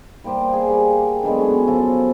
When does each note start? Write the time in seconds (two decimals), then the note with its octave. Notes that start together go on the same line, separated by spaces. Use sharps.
0.24 G3 A#3 G4 C5
0.53 G#4
0.68 G3 G4 F5
1.23 D3 F#3 G#3 B3
1.41 C#4 F#4 C#5
1.67 F3 F#3 F4 A4